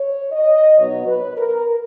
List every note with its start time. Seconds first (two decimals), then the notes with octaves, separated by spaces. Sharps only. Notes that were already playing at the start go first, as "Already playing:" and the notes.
Already playing: C#5
0.32 D#5
0.77 B2 F#3 B3 D#4 C#5
1.06 B4
1.37 A#4